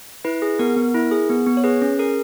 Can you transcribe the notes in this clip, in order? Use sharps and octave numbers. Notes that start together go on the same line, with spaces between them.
E4 B4
G#4
B3 A#4
B3
E4
G#4
B3
B3
C#5
G#4 B4
C#4
G#4 A#4